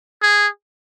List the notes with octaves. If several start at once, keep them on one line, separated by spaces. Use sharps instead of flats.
G#4